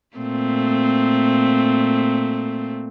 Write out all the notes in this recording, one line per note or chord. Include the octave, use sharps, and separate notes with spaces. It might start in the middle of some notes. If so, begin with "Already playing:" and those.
A#2 A3 C4